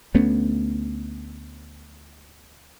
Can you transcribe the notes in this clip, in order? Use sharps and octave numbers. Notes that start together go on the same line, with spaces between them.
D2 A3 B3 C#4